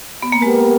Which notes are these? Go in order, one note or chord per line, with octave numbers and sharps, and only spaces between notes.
B3
A#3
G#3 B3 G4 A#4